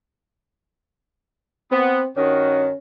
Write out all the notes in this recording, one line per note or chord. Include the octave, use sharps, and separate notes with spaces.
B3 C4
G2 D#3 C#4 F#4